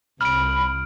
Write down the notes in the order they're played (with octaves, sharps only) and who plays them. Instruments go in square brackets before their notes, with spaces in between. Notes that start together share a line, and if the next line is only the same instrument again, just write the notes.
[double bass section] C2 [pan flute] B5 [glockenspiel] F6 D7